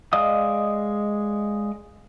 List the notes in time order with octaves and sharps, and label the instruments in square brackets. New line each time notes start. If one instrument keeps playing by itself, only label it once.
[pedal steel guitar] G#3 D5 D#5 F5 D#6